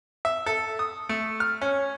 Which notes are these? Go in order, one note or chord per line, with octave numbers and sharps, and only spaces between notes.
E5
A4
D#6
A3
F6
C#4